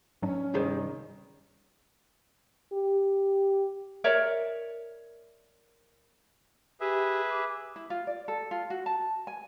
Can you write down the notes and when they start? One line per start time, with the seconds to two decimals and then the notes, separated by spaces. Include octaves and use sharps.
0.22 G#2 F#3 C#4 D4
0.54 C2 G2 D#3 E4 G#4 C5
2.73 G4
4.04 A#4 C#5 D5 E5
6.81 G4 G#4 B4 E5
7.30 D6
7.76 E4
7.90 F4
8.07 D5
8.28 A4
8.51 F4
8.70 F#4
8.86 A5
9.27 G#5